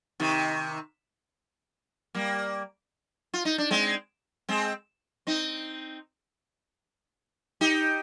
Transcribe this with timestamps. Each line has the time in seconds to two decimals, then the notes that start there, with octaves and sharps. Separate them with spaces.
0.20 C3 D#3
2.15 G3 A#3
3.34 F4
3.45 D#4
3.58 D4
3.71 G#3 C4
4.49 G#3 C4
5.27 C4 D#4
7.61 D#4 G4